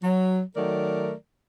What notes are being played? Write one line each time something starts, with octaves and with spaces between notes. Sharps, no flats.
F#3
D#3 F#3 A3 A#4 D5